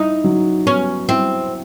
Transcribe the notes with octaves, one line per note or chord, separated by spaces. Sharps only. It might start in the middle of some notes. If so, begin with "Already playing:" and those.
Already playing: D#4 E4
F#3
B3 C#4
C4 E4